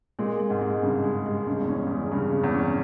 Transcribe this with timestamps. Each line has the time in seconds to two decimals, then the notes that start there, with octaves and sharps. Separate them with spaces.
0.19 A#2 G#3
0.40 G#3
0.50 G#2
0.61 G#3
0.82 G2 C#3
1.04 G#3
1.26 G#3
1.47 G2 C#3
1.60 E2
1.69 C#4
1.86 E2
1.90 G#3
2.12 G2 C#3
2.33 C#3
2.44 E2
2.54 C#4